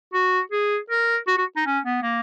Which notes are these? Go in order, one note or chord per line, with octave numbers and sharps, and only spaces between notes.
F#4
G#4
A#4
F#4
F#4
D#4
C#4
B3
A#3